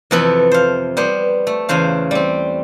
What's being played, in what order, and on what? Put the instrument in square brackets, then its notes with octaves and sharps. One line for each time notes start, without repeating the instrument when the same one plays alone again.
[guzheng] F2 C3 E3 B3 A4 B5
C5 F5
G3 B3 C5
A3
E2 C#3 C5 F5
G3 C4